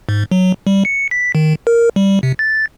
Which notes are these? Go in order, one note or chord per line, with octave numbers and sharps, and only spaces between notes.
G#2
F#3
G3
C#7
B6
D#3
A#4
G3
C3
A6